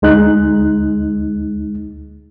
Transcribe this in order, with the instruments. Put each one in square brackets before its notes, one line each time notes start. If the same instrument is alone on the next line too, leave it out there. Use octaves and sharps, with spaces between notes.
[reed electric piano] D2 G#3 D#4 F#6